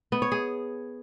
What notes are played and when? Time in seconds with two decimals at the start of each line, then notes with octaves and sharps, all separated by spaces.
0.12 B3
0.22 C#5
0.32 G#4